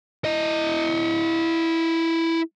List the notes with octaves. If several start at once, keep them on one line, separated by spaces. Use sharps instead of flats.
E4 D#5